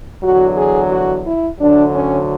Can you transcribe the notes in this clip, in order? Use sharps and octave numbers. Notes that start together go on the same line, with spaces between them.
E2 D3 F#3 F#4
G#4
F#4
E4
D2 D3 F#3 D4
C#4